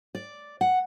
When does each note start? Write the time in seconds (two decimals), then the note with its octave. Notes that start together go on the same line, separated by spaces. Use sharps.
0.15 D5
0.61 F#5